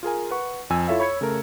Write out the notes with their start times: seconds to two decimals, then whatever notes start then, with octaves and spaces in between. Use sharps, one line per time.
0.03 F4 G#4 A#4 G#5
0.31 B4 F#5 C#6
0.70 F2 G#5 E6
0.88 E4 F4 A4 C#5 E5 F5
1.00 C#5 B5 G#6 C#7
1.21 C#3 A3 A4 A#4